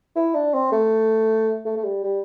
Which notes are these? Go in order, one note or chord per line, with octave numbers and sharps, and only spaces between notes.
E4
D4
C4
A3
A3
A3
G3
G3